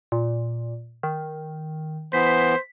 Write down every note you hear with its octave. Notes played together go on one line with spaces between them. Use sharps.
A#2
D#3
E3 B3 C5 B6